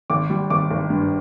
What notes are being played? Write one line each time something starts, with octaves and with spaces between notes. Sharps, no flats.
G#1 D6
G3
G#1 D6
G#1
G2